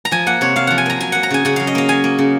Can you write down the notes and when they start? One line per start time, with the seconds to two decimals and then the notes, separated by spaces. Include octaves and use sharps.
0.05 A#5
0.11 F3 G#5
0.27 A#3 F#5
0.41 C3 C#5
0.56 C3 F5
0.67 F3 F#5
0.78 G#5
0.86 A#3 A#5
1.00 F#3 G#5
1.12 A#3 F#5
1.23 A#5
1.30 C#3 G#5
1.45 C#3 F#5
1.56 F#3 F5
1.67 D#5
1.75 A#3 F5
1.89 F#3 G#5
2.04 A#3
2.18 C#3